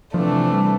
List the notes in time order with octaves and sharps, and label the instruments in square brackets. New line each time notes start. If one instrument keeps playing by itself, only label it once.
[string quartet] C3 E3 A3 D4 [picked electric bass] F3
[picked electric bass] F3
G3